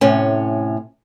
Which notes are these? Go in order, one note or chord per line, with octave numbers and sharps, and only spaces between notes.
A2 C3 C#4